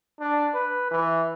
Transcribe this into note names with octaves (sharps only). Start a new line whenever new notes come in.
D4
B4
E3